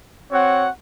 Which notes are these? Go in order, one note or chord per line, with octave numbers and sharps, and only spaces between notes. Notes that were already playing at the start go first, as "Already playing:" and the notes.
C4 F#4 C#5 F#5